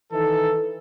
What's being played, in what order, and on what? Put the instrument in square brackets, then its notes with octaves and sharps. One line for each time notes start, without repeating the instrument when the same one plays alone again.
[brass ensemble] D#3 E3 D#4 A4